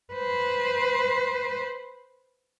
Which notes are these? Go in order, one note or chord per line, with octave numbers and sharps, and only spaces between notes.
B4 C5